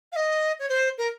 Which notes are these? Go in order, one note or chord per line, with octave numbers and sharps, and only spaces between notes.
F5
D#5
C#5
C5
A#4